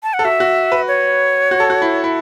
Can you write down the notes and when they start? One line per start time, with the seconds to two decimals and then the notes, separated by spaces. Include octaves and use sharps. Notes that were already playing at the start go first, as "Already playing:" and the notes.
0.03 A5
0.14 F#5
0.19 A4
0.25 F#4 E5
0.40 F#4
0.72 B4
0.88 C#5
1.51 F#4
1.60 A4
1.70 F#4
1.82 E4
2.04 E4